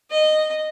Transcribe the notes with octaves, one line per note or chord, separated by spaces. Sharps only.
D#5